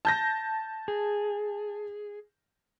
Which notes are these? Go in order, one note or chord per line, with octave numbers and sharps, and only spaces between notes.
A5 G6 A#6
G#4